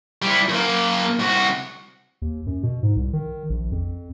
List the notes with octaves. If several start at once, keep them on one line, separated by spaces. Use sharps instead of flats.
G3 E4
F#2 A#3
C2 F#4
D#2
F#2
B2
G#2
C2
D#3
A#1
F2